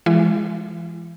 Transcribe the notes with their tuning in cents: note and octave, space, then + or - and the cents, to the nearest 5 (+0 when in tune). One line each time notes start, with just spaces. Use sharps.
E3 +40 G#3 +0 E4 +45